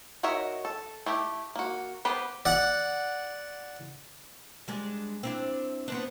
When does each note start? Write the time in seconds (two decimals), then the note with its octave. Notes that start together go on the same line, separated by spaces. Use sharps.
0.23 D#4 F#4 A#4 C#5 E5
0.65 A4
1.06 A3 E4 G4
1.55 A#3 F#4
2.05 B3 G4 B4 C5
2.45 D5 F#5
4.68 G3 G#3 D4
5.23 C4 D4 E4
5.88 B3 C4 D4